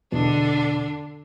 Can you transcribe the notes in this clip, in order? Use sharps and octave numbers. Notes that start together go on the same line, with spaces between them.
E2 B2 D3 D4